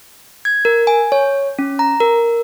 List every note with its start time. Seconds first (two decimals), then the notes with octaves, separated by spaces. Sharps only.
0.45 G#6
0.65 A#4
0.87 G#5
1.12 C#5
1.59 C#4
1.79 A#5
2.00 A#4